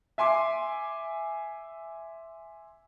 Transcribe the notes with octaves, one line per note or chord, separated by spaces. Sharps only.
E5 G#5 C6 D6